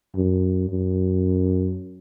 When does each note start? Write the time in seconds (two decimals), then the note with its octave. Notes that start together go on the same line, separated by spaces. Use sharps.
0.16 F#2
0.70 F#2